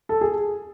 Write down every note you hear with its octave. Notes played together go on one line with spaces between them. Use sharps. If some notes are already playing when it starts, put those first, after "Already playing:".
A4
G#4